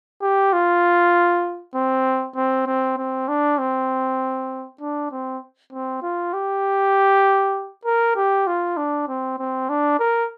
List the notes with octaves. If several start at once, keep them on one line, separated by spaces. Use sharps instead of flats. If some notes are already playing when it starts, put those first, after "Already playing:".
G4
F4
C4
C4
C4
C4
D4
C4
D4
C4
C4
F4
G4
A#4
G4
F4
D4
C4
C4
D4
A#4